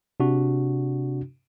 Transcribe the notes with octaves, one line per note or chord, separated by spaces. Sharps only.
C3 D4 F#4